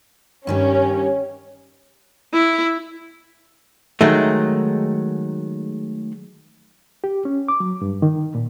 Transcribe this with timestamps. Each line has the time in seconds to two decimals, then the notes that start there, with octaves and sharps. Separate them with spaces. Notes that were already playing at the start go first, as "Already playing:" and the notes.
0.47 G2 D#3 G3 C#4
2.33 E4
4.01 D#3 F#3 G#3 A3
7.04 G4
7.25 C#4
7.48 D6
7.60 F#3
7.82 G2
8.02 D#3
8.35 A#2